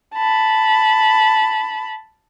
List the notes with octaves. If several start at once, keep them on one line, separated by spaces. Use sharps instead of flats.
A5 B5